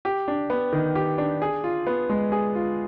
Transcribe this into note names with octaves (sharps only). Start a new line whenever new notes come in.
G4
D4
B3
D#3
G4
D4
G#4
F4
B3
G#3
G#4
F4